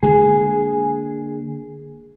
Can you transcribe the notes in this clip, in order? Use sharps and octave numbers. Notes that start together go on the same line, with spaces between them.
D3 G#3 A#3 G#4